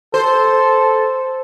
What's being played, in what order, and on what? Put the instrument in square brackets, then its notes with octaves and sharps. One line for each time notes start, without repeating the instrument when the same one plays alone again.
[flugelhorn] A4 [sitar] C5